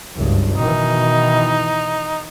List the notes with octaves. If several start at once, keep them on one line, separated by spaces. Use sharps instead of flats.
F#1 C#2 G2
B2 D#3 E3 D#4